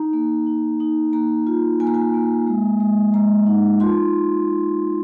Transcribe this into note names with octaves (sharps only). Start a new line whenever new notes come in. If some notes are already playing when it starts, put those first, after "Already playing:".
Already playing: D#4 A#5
A#3
D#4
D#4
A#3 A#5
F4
A#3 G#5
A#5
G#5
A#3
G#3
G#3
G#3 A#5
D#4
F4 C6